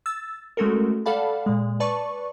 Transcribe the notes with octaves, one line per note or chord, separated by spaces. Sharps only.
E6 A6
G#3 A3 C#4 F#4 A4 A#4
A4 D5 F5 F#5 A5 B5
A#2 G#3
B4 D5 A5 C#6